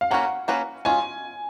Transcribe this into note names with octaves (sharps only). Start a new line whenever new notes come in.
F5
A#3 C#4 F#4 B4 F#5
A#3 C#4 F#4 B4
G#3 C#4 F4 G#5